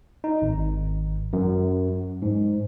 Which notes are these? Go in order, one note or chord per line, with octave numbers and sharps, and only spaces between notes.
D#4
G#1
F#2
G#2